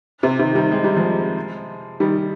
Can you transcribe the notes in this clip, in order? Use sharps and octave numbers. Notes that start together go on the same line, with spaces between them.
C3
C3 D#3
D#3 G3
G#3
G3
F3 G#3
D#3 G3